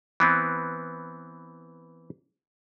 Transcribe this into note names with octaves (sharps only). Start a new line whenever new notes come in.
E3 B3 C4